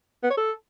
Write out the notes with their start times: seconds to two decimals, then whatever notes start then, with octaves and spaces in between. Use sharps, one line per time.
0.23 B3
0.30 C#5
0.37 A4